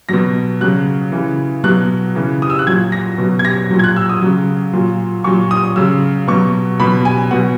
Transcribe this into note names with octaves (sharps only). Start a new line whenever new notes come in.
B2 F#3 A#6
C#3 F#3 F#6
C#3 E3
B2 F#3 F#6
C#3 E3
D#6
E6
F#6
A#2 F#3 G#6
A#6
B2 F#3
G#6
A#6
A#2 F#3
G#6
F#6
E6
D#6
C#3 F#3
A#2 F#3
A#2 F#3 C#6
D#6
C#3 F#3 E6
B2 F#3 C#6
B2 F#3 B5
G#5
B2 F#3 F#5